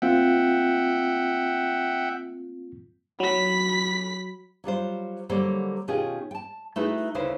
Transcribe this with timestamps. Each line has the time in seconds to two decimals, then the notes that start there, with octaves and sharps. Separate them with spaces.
0.02 A#3 C4 F4 E5 F#5 G5
3.20 F#3 B5 B6
4.64 F#3 G3 F4 C5
5.29 D3 F#3 G3 A#3 A4 C5
5.88 B2 D#3 C#4 F4 G4 G#4
6.31 G5 A5
6.76 A3 D#4 E4 F#4 G#4 B4
7.15 D2 C#3 D#4 E4 B4 C5